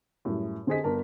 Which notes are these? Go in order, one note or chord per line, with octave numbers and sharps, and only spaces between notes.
F#2 A2 G3
D3 C4 G4 G#4 D#5 B6
G1 A#4 A5